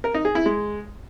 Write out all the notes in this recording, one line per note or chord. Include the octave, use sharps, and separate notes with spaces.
A#4
D#4
G#4
E4
G#3